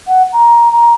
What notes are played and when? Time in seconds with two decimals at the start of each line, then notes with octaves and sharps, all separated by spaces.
0.07 F#5
0.32 A#5
0.72 A#5